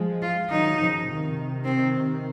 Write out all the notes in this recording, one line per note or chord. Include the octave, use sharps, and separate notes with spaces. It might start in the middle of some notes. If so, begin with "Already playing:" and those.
Already playing: F3 G#3
F4
D#3 F#3 D#4
C#3 F3
C3 D#3
C4